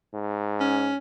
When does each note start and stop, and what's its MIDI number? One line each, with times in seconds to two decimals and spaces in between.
0.14 0.92 44
0.60 0.97 61